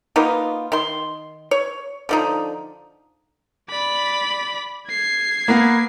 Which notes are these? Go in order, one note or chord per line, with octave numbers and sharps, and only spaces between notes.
A#3 B3 D#4 F4
D#3 C6
C#5
D3 F3 D#4
D5 B5
G#6 C7
A#3 B3